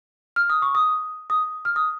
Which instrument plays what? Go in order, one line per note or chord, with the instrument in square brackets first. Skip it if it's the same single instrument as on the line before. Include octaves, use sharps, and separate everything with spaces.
[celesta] F6
D#6
C#6
D#6
D#6
F6
D#6